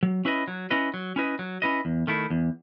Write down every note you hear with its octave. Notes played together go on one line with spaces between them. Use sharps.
F#3
C#4 E4 B4 D#5
F#3
C#4 E4 B4 D#5
F#3
C#4 E4 B4 D#5
F#3
C#4 E4 B4 D#5
E2
D#3 A3 E4
E2